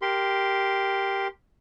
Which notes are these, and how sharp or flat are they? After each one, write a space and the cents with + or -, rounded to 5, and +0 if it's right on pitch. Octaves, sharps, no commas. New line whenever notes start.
G4 +0 A#4 +0 C6 -10